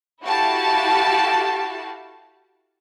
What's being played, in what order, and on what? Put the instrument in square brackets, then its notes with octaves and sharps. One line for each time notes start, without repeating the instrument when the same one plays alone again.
[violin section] E4 F#4 G4 A4 F5 A5